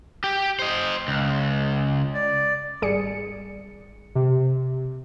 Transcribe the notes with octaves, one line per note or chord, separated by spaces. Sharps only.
G4
C5 D#5
C#2
D5
G#1 G3 G#4 D5 C#7
C3